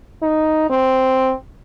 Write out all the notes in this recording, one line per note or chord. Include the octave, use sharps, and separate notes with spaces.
D#4
C4